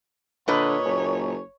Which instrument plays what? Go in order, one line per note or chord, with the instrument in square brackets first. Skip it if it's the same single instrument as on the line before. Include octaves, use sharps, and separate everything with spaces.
[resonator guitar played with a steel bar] A#2 B4 D#5 [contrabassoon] D3 [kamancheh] C#5
[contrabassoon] F#1